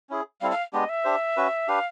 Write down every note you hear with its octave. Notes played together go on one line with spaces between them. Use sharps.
C#4 E4 G#4
G3 C4 E4 A4 F5
F5
G#3 B3 D4 G4 D#5
E5
D4 G4 C5
C#4 F#4 B4
D4 G4 B4 F5